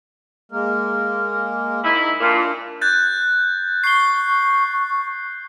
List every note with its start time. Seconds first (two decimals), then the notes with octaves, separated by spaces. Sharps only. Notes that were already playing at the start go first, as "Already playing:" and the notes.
0.52 G#3 A#3 A#4
1.84 G#2 D#4 E4
2.20 A#2 D4 F4 A#4
2.81 F#6 G6 A6
3.84 C#6 C7 G7